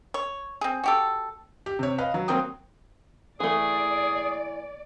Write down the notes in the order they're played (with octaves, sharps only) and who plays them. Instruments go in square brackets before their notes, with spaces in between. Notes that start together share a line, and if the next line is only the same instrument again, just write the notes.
[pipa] C#5
C4 G#4
F#4 G4 A4
[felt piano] G4
C3 C#5
B4 D#5 F5
F#3
F#3 A#3 C4 G5 D#6
[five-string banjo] E3 A3 [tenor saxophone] G#4 [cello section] D5